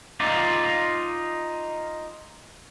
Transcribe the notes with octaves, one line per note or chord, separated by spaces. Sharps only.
D#4 F4 D5